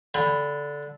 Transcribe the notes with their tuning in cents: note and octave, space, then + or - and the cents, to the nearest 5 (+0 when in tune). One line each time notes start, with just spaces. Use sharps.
D3 -10 G5 +40 B5 +5